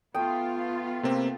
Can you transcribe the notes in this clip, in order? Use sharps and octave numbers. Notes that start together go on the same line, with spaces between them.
A3 B3 F4 G5 D#6
C3 A#3 C4